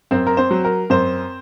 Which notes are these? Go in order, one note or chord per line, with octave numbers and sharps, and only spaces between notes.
F#2 C4 C5
A#4
C4 C5
F#3
A#4
F#2 C4 C5